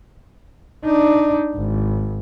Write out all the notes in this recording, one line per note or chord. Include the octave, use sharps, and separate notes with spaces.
D4 D#4
G#1